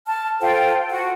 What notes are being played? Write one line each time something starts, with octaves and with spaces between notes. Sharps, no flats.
A5 F6
F4 A4 C5 G5
F#4 F#5